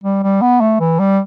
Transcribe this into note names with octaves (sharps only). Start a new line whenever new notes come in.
G3
G3
B3
A3
E3
G3